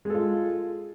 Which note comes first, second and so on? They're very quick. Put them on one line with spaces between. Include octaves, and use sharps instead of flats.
G#3 A4 F4